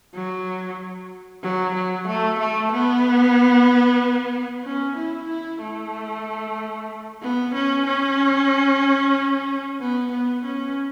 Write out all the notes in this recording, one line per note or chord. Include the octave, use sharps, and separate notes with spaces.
F#3
F#3
F#3
A3
A3
B3
C#4
E4
E4
A3
B3
C#4
C#4
B3
B3
C#4